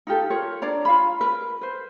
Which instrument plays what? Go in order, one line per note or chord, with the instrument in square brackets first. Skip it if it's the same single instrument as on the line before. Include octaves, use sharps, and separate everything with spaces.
[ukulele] D#4 F4 G4 A4
F4 A#4 C#5
D4 C#5 D5 A#5
F4 F5 B5
A#4 B4
B4 C5